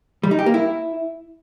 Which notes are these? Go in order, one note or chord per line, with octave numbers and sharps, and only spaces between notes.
G3
D#4
G4
A#3
E4